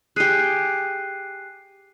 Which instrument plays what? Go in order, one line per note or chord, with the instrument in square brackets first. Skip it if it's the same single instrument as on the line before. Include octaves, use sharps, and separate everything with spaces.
[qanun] G4 G#4 [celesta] F#6 C7 D#7